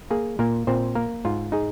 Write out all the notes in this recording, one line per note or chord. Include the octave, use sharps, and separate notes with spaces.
A#3 G#4
A#2 A#3 A#4
A#2 C4 C5
A#3 A#4
G#2 F4
D#4 G#4